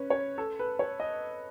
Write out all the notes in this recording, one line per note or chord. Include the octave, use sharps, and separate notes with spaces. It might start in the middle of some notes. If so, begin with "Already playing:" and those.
Already playing: C#4 B4
C#5
A4
B4
C#5
D#5